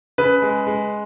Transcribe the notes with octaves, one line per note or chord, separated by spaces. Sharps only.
C#3 B4
G#3
G#3